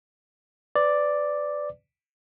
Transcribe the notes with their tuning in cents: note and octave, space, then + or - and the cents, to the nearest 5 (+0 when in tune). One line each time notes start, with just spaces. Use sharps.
B4 +30 D5 +0